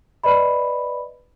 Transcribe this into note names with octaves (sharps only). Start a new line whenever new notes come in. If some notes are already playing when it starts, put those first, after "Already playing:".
B4 D5 D#5 B5